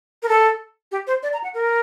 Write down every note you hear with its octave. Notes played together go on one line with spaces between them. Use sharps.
A#4
A4
G4
C5
D5
A#5
F#5
A#4